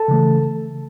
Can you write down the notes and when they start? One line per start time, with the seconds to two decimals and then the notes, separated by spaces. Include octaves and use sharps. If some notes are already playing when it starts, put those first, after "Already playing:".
Already playing: A4 A5
0.08 C#3 E3 A3